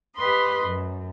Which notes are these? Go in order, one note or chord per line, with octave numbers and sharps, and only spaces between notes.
G4 B4 D#5 B5 C6
F#2